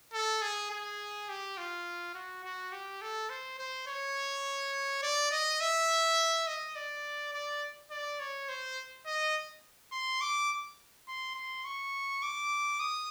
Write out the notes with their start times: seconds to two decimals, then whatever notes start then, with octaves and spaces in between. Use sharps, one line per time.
0.13 A4
0.42 G#4
0.70 G#4
1.29 G4
1.57 F4
2.15 F#4
2.44 F#4
2.72 G4
3.02 A4
3.30 C5
3.59 C5
3.87 C#5
5.02 D5
5.31 D#5
5.60 E5
6.47 D#5
6.76 D5
7.33 D5
7.91 D5
8.20 C#5
8.49 C5
9.06 D#5
9.92 C6
10.21 D6
11.08 C6
11.35 C6
11.65 C#6
12.23 D6
12.80 D#6